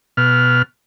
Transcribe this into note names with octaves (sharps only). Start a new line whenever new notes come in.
B2 F6